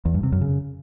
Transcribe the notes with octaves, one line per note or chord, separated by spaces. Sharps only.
E2
G2
C3
F#2
C#3